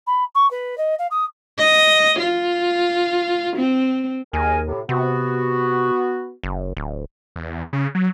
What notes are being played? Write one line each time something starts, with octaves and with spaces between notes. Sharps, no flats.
B5
C#6
B4
D#5
F5
D#6
D#5
F4
C4
D#2 G#4 A#4 G#5
A2 C3
C3 B3 F#4
F#1
D1
E2
C#3
F#3